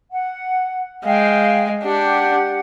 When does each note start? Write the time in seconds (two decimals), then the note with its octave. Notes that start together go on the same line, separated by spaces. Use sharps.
0.11 F#5
1.05 G#3 F5 G5
1.84 D4 G4 F#5